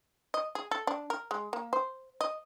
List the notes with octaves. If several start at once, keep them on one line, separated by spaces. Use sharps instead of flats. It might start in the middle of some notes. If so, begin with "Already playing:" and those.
D#5
G#4
A4
D4
A#4
G#3
A#3
C5
D#5